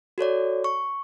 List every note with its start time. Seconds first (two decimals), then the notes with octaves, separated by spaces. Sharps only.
0.18 F#4 A4 C#5 D5
0.64 C#6